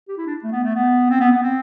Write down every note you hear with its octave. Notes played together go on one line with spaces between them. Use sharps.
G4
E4
D4
A3
B3
A3
B3
C4
B3
B3
C4